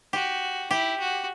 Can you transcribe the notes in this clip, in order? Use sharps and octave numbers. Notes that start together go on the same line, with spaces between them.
F#4 G4
E4 G4
F#4